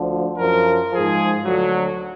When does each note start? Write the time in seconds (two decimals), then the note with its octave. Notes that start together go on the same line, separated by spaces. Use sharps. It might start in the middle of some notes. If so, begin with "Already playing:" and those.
Already playing: D2 D3 F3
0.37 F#2 F3 A#4
0.91 G#2 F3 G#4
1.44 D2 D3 F#3